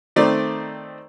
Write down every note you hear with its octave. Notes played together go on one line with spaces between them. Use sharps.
D#3 A3 C4 D5